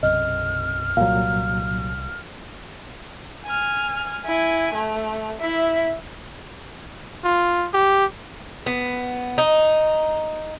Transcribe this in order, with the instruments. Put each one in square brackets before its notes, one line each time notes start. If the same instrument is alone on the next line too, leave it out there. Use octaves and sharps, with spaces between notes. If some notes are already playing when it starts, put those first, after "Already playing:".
[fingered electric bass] B1 F#2 C3 [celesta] D#5 [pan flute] F6
[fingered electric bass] C2 G3 [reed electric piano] A#2 F#3 [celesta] F5
[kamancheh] G#5 F6
E4 G#5
A3
E4 E5
[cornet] F4
G4
[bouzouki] B3
D#4